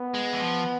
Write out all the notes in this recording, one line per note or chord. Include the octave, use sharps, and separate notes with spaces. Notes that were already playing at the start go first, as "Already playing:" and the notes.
Already playing: B3
G#3
E3
F3